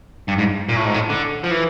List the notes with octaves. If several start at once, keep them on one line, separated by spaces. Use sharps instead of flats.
G2
G#2
A#2
A2
G#2
A2
D3
F3
E3